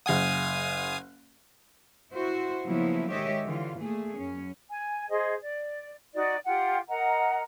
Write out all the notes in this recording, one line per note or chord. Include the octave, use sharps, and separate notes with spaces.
F#1 F5 F#5 G#5 D#6
E4 F#4 C5
C#3 F3 F#3 A#3 B3 E4
D#3 G#3 G4 C#5 D#5 E5
D3 E3 F4
A#2 A3 G#4
F#2 C#4
G#5
G#4 C5 D#5
D5
D#4 F#4 D5
F4 G4 F#5
A#4 D#5 F#5 A#5